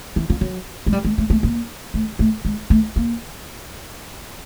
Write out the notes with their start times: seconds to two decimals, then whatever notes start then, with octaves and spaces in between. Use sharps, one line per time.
0.16 E3
0.30 F3
0.41 F#3
0.86 G#3
0.93 G3
1.05 G#3
1.18 A3
1.30 A3
1.43 A#3
1.94 A3
2.19 A3
2.45 G#3
2.70 A3
2.96 A#3